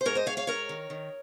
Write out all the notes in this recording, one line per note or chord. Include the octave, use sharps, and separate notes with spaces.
C5
G#2 A#4 C#5
C5 D#5
G#2 C#5 F5
C#5 F5
G#2 A#4 C#5
D#3
D#3